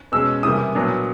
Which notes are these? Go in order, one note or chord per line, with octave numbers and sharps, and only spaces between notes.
B2 G#3 C#4 E6
C3 E3 G3 A#3 D#6
A#2 F#3 B3 D4